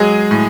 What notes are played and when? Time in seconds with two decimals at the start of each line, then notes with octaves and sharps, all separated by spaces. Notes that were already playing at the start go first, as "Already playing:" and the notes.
Already playing: F#3 G#3 G#4
0.31 A2